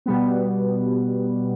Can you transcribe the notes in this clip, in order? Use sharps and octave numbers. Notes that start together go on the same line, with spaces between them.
B2 G3 B3